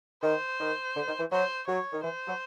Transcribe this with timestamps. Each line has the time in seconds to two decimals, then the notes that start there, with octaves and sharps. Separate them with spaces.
0.23 D#3 C5
0.60 D#3
0.95 D3
1.07 D#3
1.19 E3
1.32 F#3 C5
1.67 F#3 C#5
1.93 D#3
2.03 E3 C5
2.27 F#3